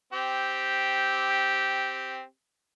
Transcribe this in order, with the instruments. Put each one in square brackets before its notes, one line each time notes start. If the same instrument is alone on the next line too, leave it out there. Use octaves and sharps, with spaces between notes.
[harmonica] C4 G4